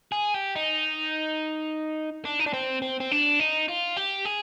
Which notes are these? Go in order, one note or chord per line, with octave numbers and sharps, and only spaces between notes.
G#4
G4
D#4
D4
D#4
D4
C4
C4
C4
D4
D#4
F4
G4
G#4